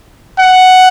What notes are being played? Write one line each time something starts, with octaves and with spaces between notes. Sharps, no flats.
F#5